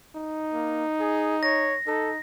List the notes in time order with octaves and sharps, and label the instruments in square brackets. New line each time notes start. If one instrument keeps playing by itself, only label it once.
[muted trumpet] D#4
[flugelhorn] A#3
G#4
[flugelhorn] C#5 [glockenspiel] A#6
[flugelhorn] D#4 [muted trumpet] A4